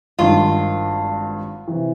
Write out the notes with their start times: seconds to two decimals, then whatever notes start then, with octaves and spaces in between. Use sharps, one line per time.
0.19 G#1 G2 D#3 F4
1.68 C3 E3